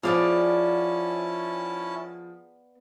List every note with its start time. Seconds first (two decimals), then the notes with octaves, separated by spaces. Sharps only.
0.03 F3 B3 C#4 E4 G#4 D5 F5 A5